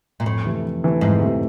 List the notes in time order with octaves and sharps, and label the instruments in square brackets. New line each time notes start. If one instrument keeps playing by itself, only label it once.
[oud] A#2
[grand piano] F2 [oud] A2
[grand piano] C3 E3 A3
F2
C3 E3 A3
[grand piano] F2 [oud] G#2
[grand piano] C3 E3 A3